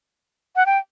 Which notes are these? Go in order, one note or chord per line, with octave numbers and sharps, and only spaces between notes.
F#5
G5